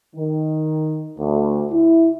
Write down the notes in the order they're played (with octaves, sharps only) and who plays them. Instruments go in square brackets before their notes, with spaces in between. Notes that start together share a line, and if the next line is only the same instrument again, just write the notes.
[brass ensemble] D#3
D2
E4